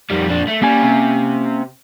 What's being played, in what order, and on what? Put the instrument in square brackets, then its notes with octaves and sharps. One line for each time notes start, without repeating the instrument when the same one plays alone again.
[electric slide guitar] F2 [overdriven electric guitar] D#3 G3
[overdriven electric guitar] A#2 D4
A3
[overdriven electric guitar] G3 [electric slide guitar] A#3 C#4 G#5
[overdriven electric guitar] C3